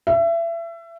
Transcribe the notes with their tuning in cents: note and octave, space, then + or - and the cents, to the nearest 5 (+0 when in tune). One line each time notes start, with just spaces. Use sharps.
E5 +30